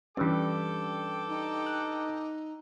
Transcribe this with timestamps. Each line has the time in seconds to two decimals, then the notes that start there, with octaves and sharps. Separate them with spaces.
0.17 G2 E3 G3 C#4 A4 G5 D6
1.28 D#4
1.66 F#6